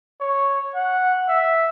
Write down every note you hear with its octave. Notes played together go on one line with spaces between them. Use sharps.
C#5
F#5
E5